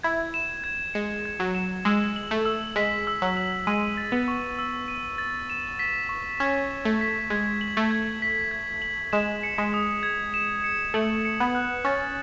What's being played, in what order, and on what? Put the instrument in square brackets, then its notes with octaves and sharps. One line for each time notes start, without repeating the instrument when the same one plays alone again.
[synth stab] E4 [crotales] G#6
[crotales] E7
G#6
[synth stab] G#3 [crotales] C#7
[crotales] G#6
[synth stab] F#3
[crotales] E7
[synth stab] G#3 [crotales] E6
[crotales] F#7
[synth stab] A3
[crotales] E6
[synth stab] G#3 [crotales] B6
[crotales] E6
[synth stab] F#3
[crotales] F#7
[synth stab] G#3 [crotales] D#7
[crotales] A6
[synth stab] B3
[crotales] C#6
E6
D#7
A6
E7
B6
C#6
[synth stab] C#4 [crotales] G#6
[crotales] E7
[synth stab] A3
[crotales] B6
[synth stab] G#3 [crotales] G#6
[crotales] F#7
[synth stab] A3
[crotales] G#6
B6
G#6
F#7
[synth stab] G#3 [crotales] E7
[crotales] C#7
[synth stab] G#3
[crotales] D#6
G#6
E7
C#7
[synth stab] A3 [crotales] F#7
[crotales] C#7
[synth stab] B3
[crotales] F#6
[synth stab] C#4 [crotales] A6